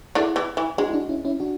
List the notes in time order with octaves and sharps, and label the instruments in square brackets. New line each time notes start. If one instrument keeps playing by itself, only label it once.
[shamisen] D3 D4 [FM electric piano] E4 G#4
[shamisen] E3 E4
E3 E4
[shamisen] G#3 [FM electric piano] D4 F#4
[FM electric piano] E4
D4 F#4
C#4 E4
C#4 E4
D4 F#4